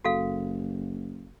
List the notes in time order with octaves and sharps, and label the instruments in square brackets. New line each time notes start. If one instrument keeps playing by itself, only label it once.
[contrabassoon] F#1 [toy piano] F#4 A4 F5